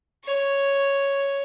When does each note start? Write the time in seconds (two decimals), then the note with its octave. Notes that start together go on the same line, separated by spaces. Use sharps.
0.25 C#5